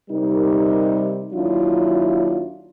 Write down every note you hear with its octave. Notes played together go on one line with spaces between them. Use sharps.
C3 G3 D#4 A#4
D#2 F#3 D4 E4 F4